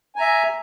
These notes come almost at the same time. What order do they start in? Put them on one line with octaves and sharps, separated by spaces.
G#5 A#5 E5